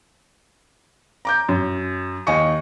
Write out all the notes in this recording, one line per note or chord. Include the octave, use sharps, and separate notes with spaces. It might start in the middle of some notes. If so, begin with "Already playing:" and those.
A#5 D6 G6
F#2
D#2 D#5 G#5 C#6 C#7